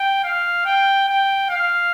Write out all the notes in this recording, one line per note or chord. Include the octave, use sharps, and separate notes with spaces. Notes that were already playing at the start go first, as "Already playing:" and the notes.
Already playing: G5
F5
G5
G5
F5